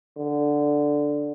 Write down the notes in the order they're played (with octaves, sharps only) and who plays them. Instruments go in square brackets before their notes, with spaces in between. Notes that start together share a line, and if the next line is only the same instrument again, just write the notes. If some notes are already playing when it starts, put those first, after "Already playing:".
[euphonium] D3